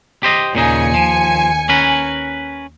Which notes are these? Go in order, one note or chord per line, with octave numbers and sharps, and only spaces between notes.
G4 C5 D#5
D#2 A#2 C#3 D#4 G#5 C#7
F3
C#4 A#4 B4